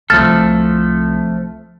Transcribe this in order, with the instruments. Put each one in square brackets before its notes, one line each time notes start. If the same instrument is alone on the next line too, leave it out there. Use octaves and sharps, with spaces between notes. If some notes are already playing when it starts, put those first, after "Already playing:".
[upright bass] C2 C3 [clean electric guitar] F3 A3 A4 [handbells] F6 A6